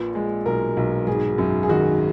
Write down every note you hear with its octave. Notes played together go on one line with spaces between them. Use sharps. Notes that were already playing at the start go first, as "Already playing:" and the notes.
Already playing: A#1 A#2 B4
G#3
B1 A#4
B1
G#1 G#4
F#2
G#4
D#3 F#4